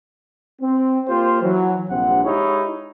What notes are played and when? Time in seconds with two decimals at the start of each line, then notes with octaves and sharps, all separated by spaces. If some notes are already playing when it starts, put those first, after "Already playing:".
0.61 C4
1.08 A#3 F4 G4 C5
1.42 E3 F#3
1.89 A#1 G2 C3 C4 F#5
2.24 G#3 D#4 E4 G4 G#4 C#5